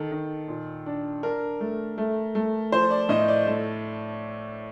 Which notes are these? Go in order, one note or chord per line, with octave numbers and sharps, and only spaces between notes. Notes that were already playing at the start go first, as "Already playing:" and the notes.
Already playing: D#3 A4
D#3
A#2
D4
D4 A#4
A3
A3
A3
F3 C5
D5
A2 D#5
D5
A3